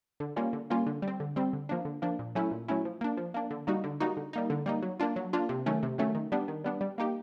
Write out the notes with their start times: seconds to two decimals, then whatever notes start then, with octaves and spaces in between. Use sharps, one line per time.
0.20 D3
0.36 G3 A#3 C#4 F4
0.53 D3
0.70 G3 A#3 C#4 F4
0.86 D3
1.02 G3
1.08 C4
1.20 D3
1.36 G3 C4
1.53 D3
1.69 F3 A#3 D4
1.85 D3
2.02 F3 A#3 D4
2.19 A#2
2.35 F#3 A3 C#4 E4
2.51 A#2
2.68 F#3 A3 C#4 E4
2.85 F3
3.01 A#3 D4
3.17 F3
3.34 A#3 D4
3.51 D3
3.67 G3 A#3 D#4 F#4
3.84 D3
4.00 G3 A#3 D#4 F#4
4.17 D3
4.33 G3 A#3 D#4
4.50 D3
4.66 G3 A#3 D#4
4.82 F#3
5.00 A#3 D4 F4
5.16 F#3
5.33 A#3 D4 F4
5.49 C3
5.66 D#3 F#3 A3 C#4
5.83 C3
5.98 D#3 F#3 A3 C#4
6.15 D#3
6.32 G3 B3 D4
6.48 D#3
6.64 G3 B3 D4
6.81 G3
6.98 A#3 D#4 G4